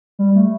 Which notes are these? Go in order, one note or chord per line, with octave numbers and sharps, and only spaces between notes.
G3
A3